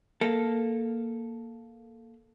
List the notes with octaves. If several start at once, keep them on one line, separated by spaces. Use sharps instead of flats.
A#3 A4